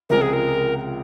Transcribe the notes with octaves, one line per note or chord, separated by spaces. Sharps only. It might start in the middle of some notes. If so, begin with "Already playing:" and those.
C#2 C3 F3 G#3 C4 A#4
G#4
A#4